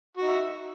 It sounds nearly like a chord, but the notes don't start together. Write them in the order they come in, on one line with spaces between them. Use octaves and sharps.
F#4 D#4 E5